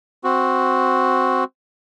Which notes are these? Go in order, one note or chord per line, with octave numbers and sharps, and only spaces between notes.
C4 F#4